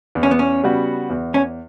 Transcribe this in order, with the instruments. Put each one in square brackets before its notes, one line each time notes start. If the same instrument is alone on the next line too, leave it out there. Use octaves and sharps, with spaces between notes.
[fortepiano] E2
[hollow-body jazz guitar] C#4
B3
C#4
[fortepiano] C#3 G3 B3 F#4
E2
[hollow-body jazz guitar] C#4